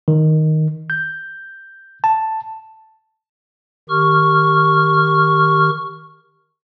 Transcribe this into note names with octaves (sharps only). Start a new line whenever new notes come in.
D#3
G6
A5
D#3 G4 C#6 F6